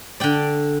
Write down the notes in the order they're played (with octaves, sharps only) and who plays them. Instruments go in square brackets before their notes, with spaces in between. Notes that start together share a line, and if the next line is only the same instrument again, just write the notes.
[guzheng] D3 D5 G5